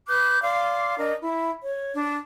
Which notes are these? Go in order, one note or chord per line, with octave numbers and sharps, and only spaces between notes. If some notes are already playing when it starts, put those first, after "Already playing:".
B4 D6 F#6 G6
D5 F5 C6 D6
D4 A#4 D5 D#5
E4
C#5
D4